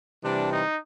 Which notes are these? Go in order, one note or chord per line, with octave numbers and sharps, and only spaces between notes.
C3 E3 G3 D4
D#4